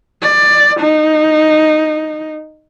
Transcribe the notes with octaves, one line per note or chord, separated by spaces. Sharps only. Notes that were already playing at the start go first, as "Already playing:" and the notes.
D5
D#4